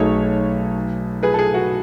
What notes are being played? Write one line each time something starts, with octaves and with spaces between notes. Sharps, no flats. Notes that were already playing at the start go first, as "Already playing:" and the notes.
Already playing: B1 B2 A3 D#4 G#4 A4 C#5
G#4 B4
A4
G#4
F#4